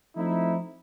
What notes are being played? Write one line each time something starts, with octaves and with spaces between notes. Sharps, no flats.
F3 A3 C4 D#4 E4